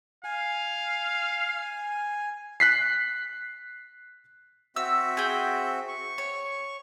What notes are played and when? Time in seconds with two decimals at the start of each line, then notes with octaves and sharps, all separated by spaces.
0.24 F5 G#5
2.60 F#6 B6 C7
4.76 C4 F#4 E5 E6
5.17 G#4 G5
5.88 C#6
6.18 C#5